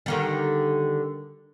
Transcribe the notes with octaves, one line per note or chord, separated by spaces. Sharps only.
D3 D#3 G3